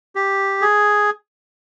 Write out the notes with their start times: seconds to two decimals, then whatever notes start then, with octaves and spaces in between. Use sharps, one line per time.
0.15 G4
0.61 G#4